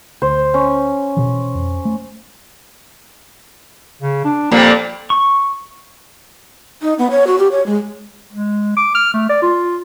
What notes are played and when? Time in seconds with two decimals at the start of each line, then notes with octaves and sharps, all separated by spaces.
0.22 D2 C5
0.54 C#4
1.17 B2 E3
1.54 F2
1.85 A3
4.02 C#3
4.25 D4
4.51 F2 A#2 G3 A#3
5.10 C#6
6.82 D#4
6.99 B3
7.11 C#5
7.27 F#4
7.38 G4
7.52 C#5
7.66 G#3
8.33 G#3
8.76 D6
8.95 F6
9.14 A3
9.29 D5
9.42 F4